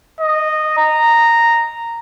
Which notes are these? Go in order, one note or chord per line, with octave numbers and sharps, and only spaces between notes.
D#5
A#5